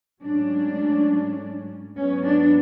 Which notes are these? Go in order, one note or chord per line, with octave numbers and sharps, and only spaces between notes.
G#2 F#3 A3 C#4 D4
G#2 F#3 B3 C#4
D4